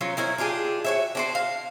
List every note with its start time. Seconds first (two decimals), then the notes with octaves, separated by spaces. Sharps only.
0.01 F#3 C#4 F4
0.17 D#4 E4 A#4 C#5
0.38 D4 F4 G4 G#4
0.85 F#4 C#5 E5
1.15 D4 F#4 C5
1.35 F5